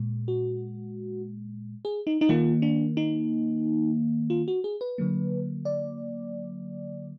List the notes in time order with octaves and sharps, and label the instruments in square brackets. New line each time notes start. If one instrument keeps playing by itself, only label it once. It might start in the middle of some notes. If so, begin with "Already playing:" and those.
Already playing: [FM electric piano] A#2 G#3
F#4
G#4
D#4
D#4
D#3 A#3 F4
D4
D#4
F4
F#4
G#4
B4
D3 F#3 A#3
D5